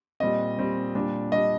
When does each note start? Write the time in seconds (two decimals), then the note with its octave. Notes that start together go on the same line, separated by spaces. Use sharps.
0.20 A#2 G3 C4 D#5
0.58 A#2 G3 C4
0.95 A#2 G3 D4
1.32 A#2 G3 D4 D#5